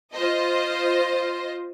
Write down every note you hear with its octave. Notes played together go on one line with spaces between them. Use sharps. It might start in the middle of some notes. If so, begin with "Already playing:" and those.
F4 C5 D#5